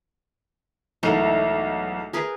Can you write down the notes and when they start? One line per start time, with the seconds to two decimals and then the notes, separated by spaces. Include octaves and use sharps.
1.03 B1 G#2 E3 A3 A#4
2.13 G#4 A#4 B4